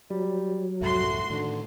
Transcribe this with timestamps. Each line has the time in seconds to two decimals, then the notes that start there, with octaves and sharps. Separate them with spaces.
0.10 F#3 G3
0.81 C2 F2 G#2 A3 F#4 C6
1.30 A2 D3 D#3